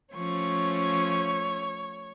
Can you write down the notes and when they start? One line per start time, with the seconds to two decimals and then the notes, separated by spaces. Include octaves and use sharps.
0.15 F3 A3 C#4 C#5 C#6